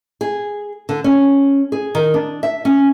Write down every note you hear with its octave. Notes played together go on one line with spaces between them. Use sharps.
G#4
D3
C#4
G#4
D#3
D4
E5
C#4